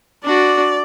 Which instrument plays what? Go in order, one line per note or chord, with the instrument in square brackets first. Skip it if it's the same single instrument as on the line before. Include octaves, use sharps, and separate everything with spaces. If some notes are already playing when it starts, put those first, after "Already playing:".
[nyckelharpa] D4 F#4 [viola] D5